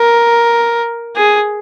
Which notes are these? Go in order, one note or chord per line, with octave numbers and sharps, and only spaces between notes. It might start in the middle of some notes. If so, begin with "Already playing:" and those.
Already playing: A#4
G#4